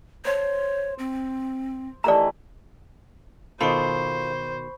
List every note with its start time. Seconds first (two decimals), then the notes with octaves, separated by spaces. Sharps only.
0.25 C5 C#5 C6
0.99 C4
2.04 D#3 E3 A3 G4 D5 A#5
3.61 B2 D#3 F4 A4 C5 B5 C#6